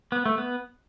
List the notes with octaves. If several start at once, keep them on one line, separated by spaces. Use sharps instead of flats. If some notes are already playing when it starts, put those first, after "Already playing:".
B3
A3
B3